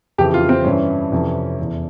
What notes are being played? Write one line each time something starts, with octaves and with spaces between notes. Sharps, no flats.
F2 C#3 E3 G4
F4
C4
G2 E3 C#4
F2 C3 E3
E2 E3